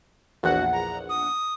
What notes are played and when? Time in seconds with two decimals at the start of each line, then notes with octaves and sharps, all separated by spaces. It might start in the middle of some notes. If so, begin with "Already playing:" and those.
0.43 A#1 E2 F#4 F#5
0.73 A#5
1.09 D#6